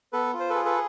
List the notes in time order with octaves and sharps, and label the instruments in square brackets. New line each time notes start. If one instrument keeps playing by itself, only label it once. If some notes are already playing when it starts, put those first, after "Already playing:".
[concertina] B3 A4 B4
F4
C5
A4 B4
G#4
A4 B4